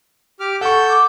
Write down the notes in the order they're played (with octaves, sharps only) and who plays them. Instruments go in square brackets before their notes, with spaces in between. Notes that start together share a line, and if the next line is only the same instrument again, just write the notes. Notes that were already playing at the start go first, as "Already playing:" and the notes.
[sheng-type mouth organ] G4 D6 F6
[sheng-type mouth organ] A4 E6 G6 [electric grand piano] F#5 C#6
[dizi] D6